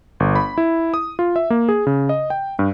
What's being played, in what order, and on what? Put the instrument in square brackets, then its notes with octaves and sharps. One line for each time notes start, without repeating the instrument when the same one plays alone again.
[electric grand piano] G1
B5
E4
D#6
F4
E5
A#3
G#4
C#3
D#5
G5
G2